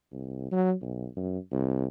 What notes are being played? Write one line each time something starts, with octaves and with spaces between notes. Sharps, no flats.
C2
F#3
B1
F#2
C2